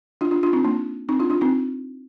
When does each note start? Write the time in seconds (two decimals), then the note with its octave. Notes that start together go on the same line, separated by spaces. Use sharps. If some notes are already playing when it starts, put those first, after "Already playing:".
0.21 D4 F4
0.31 D4 F4
0.43 D4 F4
0.53 C4 D#4
0.65 A#3 D4
1.09 C4 D#4
1.19 D4 F4
1.30 D4 F4
1.41 C4 D#4